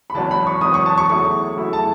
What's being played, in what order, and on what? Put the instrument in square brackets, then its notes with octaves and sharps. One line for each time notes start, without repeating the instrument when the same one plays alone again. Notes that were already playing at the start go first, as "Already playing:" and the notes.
[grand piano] B5
[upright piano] G#1 F#2 E3 [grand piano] A5
[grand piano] B5
C#6
[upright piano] G#1 F#2 E3 [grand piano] D#6
[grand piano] C#6
A5
C#6
[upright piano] E2 C#3 F#3 A3 E4 [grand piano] C#6
[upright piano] E2 C#3 F#3 A3 E4
[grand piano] A5